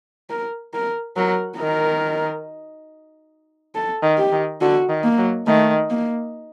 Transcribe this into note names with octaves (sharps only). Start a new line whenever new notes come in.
A#4
A#4
F#3 A#4
D#3 A#4
A4
D#3
G4
D#3
D3 F#4
D#3
A#3
F#3
D#3 A3
A#3